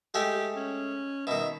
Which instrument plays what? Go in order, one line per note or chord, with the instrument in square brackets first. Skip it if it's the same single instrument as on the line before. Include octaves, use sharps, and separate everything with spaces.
[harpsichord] G#3 A3 G#5 [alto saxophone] G4
[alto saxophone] C#4
[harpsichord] B2 D#3 [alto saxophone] E5